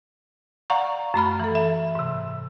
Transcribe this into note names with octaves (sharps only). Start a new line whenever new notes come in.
D5 F5 F#5 A#5 C#6
F#2 A3 B5 F6
E3 A4
E5
G#2 C3